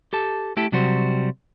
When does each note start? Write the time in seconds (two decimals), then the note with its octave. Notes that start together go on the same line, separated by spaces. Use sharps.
0.13 G4 A4 A5
0.57 A3 E4 G4 A4
0.72 C3 F#3 G3 F#4 C5